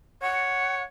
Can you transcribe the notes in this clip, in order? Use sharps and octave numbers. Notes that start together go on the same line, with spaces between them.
C#5 F#5